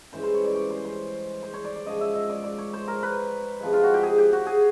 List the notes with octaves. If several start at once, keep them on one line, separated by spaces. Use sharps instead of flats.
G2 E3 G#3 C#4 C5
C5
C#5
D5
C#5
C5
C5
C5
C#5
D5
D5
G#2 F3 G#3 C#4 D#5
E5
D#5
D5
D5
C#5
C5
A#4
B4
C3 F3 G#3
F4
F#4
G4
G#4
G4
F#4
G#4